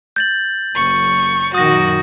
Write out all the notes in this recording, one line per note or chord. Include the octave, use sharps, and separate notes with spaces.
G6 A6 F#7
F#1 C#6
F#2 A#2 D#3 F#4 D#6 A#6